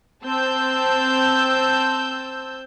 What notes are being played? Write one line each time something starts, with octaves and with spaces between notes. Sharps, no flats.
C4 A5 E6 G6